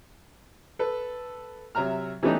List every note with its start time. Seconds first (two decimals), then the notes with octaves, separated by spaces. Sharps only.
0.79 A4 B4
1.75 C3 F#3 E5 A#5 F6
2.23 E3 G3 A3 B3 C#4 D#4